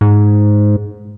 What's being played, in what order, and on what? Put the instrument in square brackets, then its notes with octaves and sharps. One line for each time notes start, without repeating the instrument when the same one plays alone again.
[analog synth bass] G#2